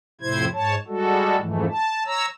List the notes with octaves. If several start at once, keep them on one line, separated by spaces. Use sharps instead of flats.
F2 A2 C3 E4 C5 G#6
G#2 C#5 A5
G3 G#3 F#4 A4
F2 G#2 E3 A3
A5
C#5 A#5 E6